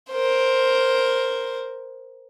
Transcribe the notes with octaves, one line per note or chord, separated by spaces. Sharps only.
A#4 C5